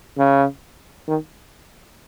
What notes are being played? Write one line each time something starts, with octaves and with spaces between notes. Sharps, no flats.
C#3
D#3